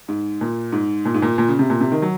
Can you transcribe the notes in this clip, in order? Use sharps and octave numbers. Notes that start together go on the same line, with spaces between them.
G#2
A#2
G#2
A#2
G#2
A#2
A#2
C#3
C3
A#2
C3
D#3
F#3